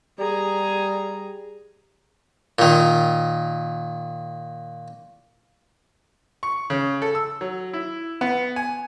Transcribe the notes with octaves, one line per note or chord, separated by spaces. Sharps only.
G3 G#4 A#5
A#2 D#3
C#6
C#3
A4
E6
F#3
E4
B3
G#5